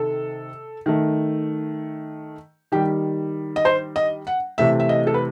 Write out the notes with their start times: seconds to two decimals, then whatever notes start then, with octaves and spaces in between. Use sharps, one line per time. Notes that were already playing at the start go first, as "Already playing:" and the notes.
Already playing: C3 D#3 A4
0.86 D#3 A3
2.72 D#3 G3 G4
3.56 D#5
3.65 C5
3.96 D#5
4.27 F#5
4.58 C3 E3 A3 E5
4.80 E5
4.89 D#5
5.07 A4
5.14 B4